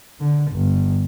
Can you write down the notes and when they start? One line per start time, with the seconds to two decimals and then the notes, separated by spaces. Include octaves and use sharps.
0.20 D3
0.52 G1